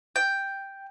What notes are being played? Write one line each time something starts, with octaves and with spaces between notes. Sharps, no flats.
G5